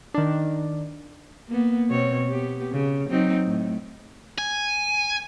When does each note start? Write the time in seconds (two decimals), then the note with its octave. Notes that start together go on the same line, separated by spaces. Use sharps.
0.14 D#3 D4
1.48 A#3 B3
1.90 B2 C4 C#5
2.28 B3 G4
2.72 C#3
3.09 F#3 C4 D#4
3.46 A2
4.38 G#5